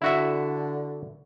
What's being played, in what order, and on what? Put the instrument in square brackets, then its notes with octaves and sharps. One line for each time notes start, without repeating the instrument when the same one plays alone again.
[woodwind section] D3 [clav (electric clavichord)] E4 F#4 E5